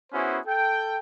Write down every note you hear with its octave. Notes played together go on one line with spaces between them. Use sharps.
B3 C#4 E4 F#4 G#4 C5
A4 G5